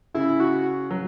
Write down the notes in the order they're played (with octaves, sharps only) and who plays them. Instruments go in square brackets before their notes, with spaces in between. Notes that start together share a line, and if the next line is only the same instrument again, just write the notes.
[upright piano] C#3 [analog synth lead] E4
[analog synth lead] F#4
[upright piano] F#3